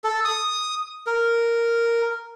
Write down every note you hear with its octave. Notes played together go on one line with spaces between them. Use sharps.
A4
D#6
A#4